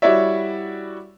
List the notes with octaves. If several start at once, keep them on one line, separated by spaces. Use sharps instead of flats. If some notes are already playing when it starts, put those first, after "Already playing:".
G3 E4 F#4 C#5 D5 E5